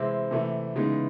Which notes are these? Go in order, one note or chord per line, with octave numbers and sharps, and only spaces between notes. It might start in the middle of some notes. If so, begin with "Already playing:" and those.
Already playing: C3 E3 G#3 C4 E4
C3 E3 A3
C#3 E3 G#3 B3 D#4